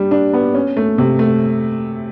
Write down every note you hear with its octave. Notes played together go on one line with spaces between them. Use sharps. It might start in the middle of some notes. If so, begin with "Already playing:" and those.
Already playing: G3 D4
D4
B3
C#4
A3
C3
A3